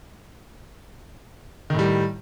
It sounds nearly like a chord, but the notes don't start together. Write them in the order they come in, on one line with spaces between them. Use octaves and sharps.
D#3 A2 G3